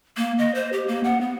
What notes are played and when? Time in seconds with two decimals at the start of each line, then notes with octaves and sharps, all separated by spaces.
0.17 A#3
0.39 D#5
0.55 C5
0.73 G4
0.88 A#3
1.04 F#5
1.21 B3